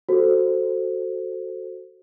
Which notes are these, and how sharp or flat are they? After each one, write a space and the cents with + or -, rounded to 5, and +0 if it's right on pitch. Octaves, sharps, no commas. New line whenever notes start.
F#4 +0 A4 +0 C5 +0